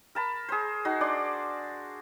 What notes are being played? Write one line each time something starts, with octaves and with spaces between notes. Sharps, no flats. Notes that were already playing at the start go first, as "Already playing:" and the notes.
A#4 A5 B5
G#4 C5
D#4 F#4
D4 D5 C6